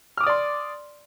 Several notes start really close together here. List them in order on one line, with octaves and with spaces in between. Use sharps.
F6 D6 D#6 D5 C6